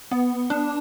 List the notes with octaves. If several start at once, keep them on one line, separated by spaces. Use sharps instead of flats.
B3
D4